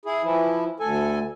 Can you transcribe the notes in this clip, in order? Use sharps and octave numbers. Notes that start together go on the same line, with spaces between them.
E4 G#4
E3 F3 E4
D2 A4 G#5